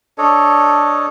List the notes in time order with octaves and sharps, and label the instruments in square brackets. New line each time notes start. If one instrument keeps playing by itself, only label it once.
[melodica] D4 A4 C#5 D#5